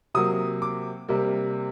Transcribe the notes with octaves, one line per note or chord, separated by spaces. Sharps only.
C3 F#3 A#3 D#6
D6
C3 G3 A#3